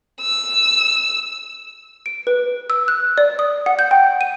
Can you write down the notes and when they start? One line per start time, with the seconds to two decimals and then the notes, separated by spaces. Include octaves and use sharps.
0.21 E6
2.06 D7
2.27 B4
2.70 E6
2.88 F#6
3.18 D5
3.39 D#6
3.66 F#5
3.79 G6
3.91 G5
4.21 D#7